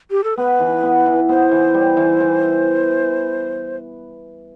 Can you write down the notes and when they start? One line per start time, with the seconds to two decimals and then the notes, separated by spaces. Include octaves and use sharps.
0.11 G4
0.24 A4
0.38 B3 B4
0.60 E3
0.83 B3
1.06 E3
1.29 B3 C5
1.51 E3
1.74 G3
1.97 E3
2.20 E3